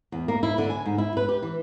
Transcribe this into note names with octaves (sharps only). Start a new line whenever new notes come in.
E2
A#3
E4
D3
G#5
G#2
E4
B4
G4
E3